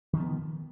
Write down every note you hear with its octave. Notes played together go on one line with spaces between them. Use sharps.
D#3 F3 B3